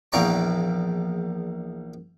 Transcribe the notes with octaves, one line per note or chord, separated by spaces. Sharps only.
A#1 E2 A#3 G5 A#5 C#6